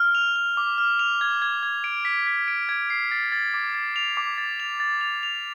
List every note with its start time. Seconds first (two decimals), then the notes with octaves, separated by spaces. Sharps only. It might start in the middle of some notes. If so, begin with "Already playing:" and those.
Already playing: F6
0.15 F7
0.36 F6
0.57 D6
0.78 F6
0.99 F7
1.21 G#6
1.42 G#6
1.63 G#6
1.84 D7
2.05 B6
2.27 B6
2.48 D7
2.69 G#6
2.90 C7
3.11 A6
3.32 A6
3.54 D6
3.75 A6
3.96 F7
4.17 D6
4.38 A6
4.60 F7
4.80 A6
5.01 F7
5.23 F7